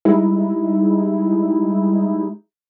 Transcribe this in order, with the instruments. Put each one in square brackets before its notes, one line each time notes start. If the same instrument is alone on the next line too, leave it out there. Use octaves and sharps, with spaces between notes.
[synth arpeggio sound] G3 G#3 D#4 E4